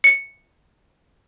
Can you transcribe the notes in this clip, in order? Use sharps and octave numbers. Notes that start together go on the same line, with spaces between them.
C#7